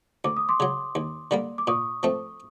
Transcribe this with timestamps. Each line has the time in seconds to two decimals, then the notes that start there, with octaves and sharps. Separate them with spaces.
0.25 D2 D6
0.37 D#6
0.49 C6 D6
0.60 C#3 F#3
0.95 D#2
1.31 D3 G3 A#3
1.58 D6
1.67 A#2 C#6 D#6
2.03 F3 A3 C4